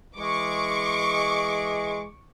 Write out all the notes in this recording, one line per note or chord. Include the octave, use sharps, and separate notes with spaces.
E3 G#3 C#6 D6